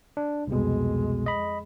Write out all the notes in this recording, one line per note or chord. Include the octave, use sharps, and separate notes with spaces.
D4
C2 F2 B2 G#3
D#5 B5